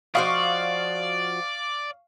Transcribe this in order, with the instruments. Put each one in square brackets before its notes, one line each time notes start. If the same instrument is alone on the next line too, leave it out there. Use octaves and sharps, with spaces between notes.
[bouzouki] F3 F#4 D#5 [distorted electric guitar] D5 [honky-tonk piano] F5 C#6